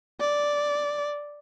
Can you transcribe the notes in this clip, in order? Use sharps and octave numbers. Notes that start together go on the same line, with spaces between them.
D5